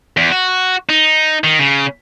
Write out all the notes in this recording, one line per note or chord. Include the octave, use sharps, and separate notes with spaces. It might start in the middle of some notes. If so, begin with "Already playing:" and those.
E2
F#4
D#4
D#3
C#3